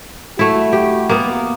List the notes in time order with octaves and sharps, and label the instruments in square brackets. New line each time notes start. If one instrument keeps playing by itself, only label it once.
[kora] A3 E4 [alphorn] F#4
[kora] G4
A#3 B3